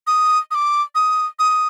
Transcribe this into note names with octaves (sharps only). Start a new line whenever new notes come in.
D#6
D#6
D6
D#6
D#6